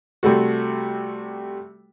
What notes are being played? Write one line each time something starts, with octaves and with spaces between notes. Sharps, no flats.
C3 G3 A3 F#4